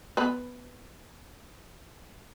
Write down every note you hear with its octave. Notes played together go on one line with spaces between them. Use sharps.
B3 B4